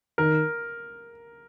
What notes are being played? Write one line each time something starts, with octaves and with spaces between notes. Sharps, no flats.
D#3 A#4